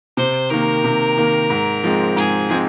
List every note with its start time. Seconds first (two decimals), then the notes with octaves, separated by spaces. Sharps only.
0.17 C3 C5
0.50 D#3 A#3 A#4
0.84 C3
1.17 D#3 A#3
1.50 G#2
1.84 F3 G#3 C4
2.16 G#2 G#4
2.50 F3 G#3 C4